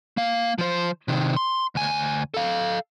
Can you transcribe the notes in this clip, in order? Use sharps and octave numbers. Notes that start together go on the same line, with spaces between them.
A#3 F5
F3 C5
C3 D#3
C6
D2 G#5
A4 F5